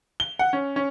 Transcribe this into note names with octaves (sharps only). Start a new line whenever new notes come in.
G7
F#5
C#4
C#4